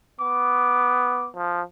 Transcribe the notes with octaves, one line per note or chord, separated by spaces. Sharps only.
B3 D6
F3